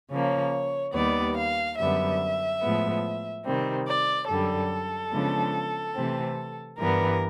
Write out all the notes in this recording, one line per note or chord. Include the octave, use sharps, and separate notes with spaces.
C#3 F3 A#3 C#5
D#2 D#3 G3 B3 D5
F5
F#2 D3 G3 B3 E5
A2 F3 G#3 B3
C3 D#3 G3 C4
D5
F#2 D3 G3 A4
C#3 F3 G#3 B3 D4
C3 E3 A3 C4
G2 E3 G3 B3 A#4